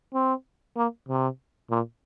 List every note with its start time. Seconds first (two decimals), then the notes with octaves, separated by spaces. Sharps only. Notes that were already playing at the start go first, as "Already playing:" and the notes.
0.14 C4
0.77 A#3
1.09 C3
1.71 A#2